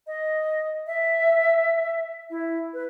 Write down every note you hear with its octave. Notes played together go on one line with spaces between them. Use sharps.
D#5
E5
E4
B4